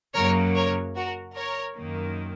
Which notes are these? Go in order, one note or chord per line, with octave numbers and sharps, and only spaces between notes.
F#2 C#3 F#3 A#3 A#4 C#5
A#4 C#5
F#4 A#4
A#4 C#5
F#2 D#3 A#3